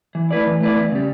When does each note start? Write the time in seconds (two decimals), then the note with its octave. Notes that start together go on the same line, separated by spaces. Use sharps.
0.15 E3
0.31 A3 E4 B4 D5
0.46 E3
0.61 A3 E4 B4 D5
0.76 E2
0.92 C#3 G3